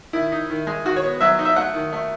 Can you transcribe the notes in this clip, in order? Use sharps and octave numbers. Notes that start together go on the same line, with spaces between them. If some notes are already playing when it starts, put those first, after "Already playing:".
D#3 E4
D#4
D#3
G#3
D#3 F#4
C#5
B3
F#3 E5
D#4
E5
A3 F#5
D#3
A3